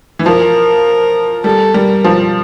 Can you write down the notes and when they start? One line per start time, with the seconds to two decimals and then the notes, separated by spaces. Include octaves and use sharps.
0.19 E3
0.25 F3 A#4
1.44 G3 A4
1.74 G3 A#4
2.04 F3